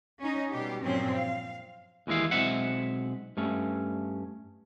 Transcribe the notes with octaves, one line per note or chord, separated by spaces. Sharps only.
C#4 D#4
B2 G3 G4
G2 A#2 F3 F#3 C4 C#4
F5
D#2 E3 G#3 E4 F5
B1 G#3 C4 E5 F#5
G2 A3 C#4